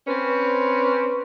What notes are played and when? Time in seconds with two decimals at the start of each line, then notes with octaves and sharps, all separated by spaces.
0.07 C4 C#4 B4